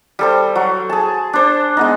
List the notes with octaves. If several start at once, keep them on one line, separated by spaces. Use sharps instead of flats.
G3 A4 C5
F#3
G#4 A5
D4 C5
G#3 B3 D#4